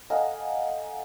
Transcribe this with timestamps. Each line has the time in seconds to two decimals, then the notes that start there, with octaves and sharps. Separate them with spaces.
0.10 A4 D#5 F5 F#5 G#5 A#5